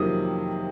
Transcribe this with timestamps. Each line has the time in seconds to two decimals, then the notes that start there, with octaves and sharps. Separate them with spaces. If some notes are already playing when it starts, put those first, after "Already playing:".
Already playing: F2 C3 D#3 F#3 A#3 D#6